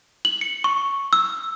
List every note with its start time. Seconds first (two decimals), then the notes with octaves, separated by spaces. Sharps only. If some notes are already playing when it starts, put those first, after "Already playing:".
0.25 F#7
0.41 C#7
0.64 C#6
1.13 E6